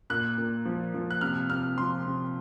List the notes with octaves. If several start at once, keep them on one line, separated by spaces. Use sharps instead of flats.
A#2 F#6
A#2
F3
F3
F#6
C3 F6
C3 F6
F3 C6
C3